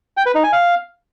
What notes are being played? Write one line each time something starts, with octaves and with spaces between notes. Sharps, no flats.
G5
B4
D#4
G#5
F5